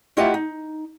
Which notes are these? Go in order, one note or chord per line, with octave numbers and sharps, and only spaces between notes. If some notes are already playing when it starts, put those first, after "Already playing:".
A3 E4 F4 G4 D#5 F#5
D#4